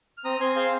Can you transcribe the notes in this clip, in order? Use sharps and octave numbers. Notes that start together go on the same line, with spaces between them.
F6
C4 A#5 D#6
C4 G#5 C6
G#4 C5 F5